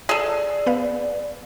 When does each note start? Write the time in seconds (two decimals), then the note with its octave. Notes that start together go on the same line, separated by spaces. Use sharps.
0.09 G#4 A4 D5
0.66 B3 B4 F5